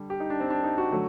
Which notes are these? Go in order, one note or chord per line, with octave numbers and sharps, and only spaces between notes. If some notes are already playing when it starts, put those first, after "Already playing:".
Already playing: D3 G3
G4
D#4
D4
C4
D4
D#4
F#4
D3 F#3 A3